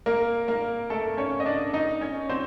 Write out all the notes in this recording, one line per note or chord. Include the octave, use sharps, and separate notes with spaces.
A#3 A#4
A#3 A#4
A3 A4
C#4 C#5
D#5
D4 D5
D#4 D#5
C#4 C#5
C4 C5